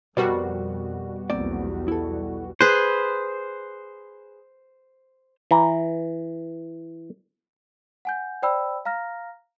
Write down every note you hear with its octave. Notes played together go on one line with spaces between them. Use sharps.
F2 B2 G3 F#4 A#4 C5 D5
B1 E2 A#3 C4 D5
E4 A4
G#4 B4 C5
E3 A#5
F#5 G#5 G6
C5 D5 G5 B5 E6
F5 A#5 F6 A#6